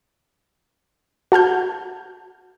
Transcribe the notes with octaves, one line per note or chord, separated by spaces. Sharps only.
F#4 A5 F6 G6